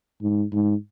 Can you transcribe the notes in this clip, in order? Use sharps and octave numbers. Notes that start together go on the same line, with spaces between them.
G#2
G#2